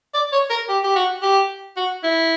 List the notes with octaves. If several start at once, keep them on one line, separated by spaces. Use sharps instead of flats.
D5
C#5
A#4
G4
G4
F#4
G4
F#4
E4